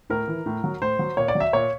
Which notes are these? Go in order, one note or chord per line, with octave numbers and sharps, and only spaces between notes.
A2 A#4
E3
A2
F#3
A2 C5
F#3
A#2 C#5
D5
F#3
E5
A#2 C#5